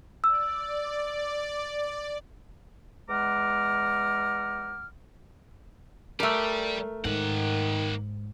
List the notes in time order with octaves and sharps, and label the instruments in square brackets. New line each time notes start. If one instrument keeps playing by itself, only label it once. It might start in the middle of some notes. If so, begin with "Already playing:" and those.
[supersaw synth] D5 [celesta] E6
[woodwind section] E2 G#3 F#5 A#5 D6 F6
[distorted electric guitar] G3 D5 [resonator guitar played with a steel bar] A3 A#4
[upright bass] G#2 [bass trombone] D#3 [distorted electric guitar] A#3 F#5